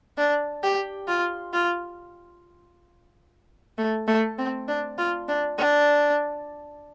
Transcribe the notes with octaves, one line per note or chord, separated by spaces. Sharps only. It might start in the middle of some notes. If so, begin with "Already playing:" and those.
D4
G4
F4
F4
A3
A3
C4
D4
F4
D4
D4